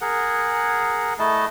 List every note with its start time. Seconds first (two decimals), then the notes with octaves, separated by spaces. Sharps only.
0.01 G#4 A#4 F#5
1.19 A3 E4 D#5 A5